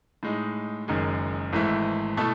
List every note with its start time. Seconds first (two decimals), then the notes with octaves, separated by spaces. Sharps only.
0.23 A2 G#3 D#4
0.88 F#1 F#2 D#3 G#3
1.53 G#1 G#2 E3 A3 E4
2.17 B2 A3 E4 A4